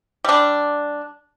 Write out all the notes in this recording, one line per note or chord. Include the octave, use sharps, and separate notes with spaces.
G3 D4